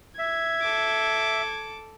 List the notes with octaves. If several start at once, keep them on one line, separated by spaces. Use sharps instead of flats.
E5 G#6
A4 D6